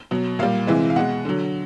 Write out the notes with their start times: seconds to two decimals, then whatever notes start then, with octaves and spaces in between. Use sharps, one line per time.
0.11 B2 F#3
0.39 A#2 G3 F5
0.67 C3 E3 G#3
0.90 F5
0.96 B2 G#3 F#5
1.25 D3 F#3